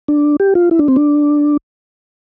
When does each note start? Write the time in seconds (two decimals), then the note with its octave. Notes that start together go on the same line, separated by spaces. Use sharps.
0.08 D4
0.40 G4
0.55 F4
0.71 E4
0.79 D4
0.88 C4
0.96 D4